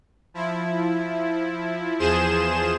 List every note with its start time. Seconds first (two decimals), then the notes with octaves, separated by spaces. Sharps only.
0.34 F3 E4
1.99 E2 F3 G#4 C5 E7